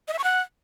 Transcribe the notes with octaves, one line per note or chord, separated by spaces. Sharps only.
D#5
E5
C#6
F#5